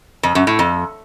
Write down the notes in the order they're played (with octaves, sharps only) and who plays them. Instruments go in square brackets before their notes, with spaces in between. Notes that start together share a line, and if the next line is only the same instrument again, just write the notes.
[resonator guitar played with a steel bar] F2
F#2
A2
F2